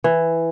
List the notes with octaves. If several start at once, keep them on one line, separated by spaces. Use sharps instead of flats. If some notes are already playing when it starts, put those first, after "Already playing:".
E3